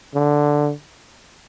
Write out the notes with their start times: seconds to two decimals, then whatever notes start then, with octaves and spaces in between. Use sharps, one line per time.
0.14 D3